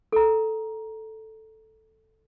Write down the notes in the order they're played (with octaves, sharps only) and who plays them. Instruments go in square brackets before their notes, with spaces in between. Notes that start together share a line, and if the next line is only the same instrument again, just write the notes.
[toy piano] A4 A#5